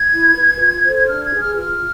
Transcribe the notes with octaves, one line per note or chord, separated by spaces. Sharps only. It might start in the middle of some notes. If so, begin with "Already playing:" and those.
Already playing: G#6
E4
B4
F4
A4 C5
G#6
D4 F6
G#6
G#4 B4
F6
F4 F6